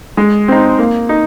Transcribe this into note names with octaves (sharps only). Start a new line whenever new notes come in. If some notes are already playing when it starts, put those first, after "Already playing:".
G#3
C4 D#4
A#3
D#4